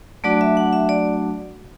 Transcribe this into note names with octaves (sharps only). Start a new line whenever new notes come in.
F#3 A3 D4 F#4 D5
E5
F#5
E5
D5